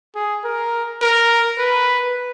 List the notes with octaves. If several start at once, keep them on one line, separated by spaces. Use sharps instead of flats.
G#4
A#4
A#4
B4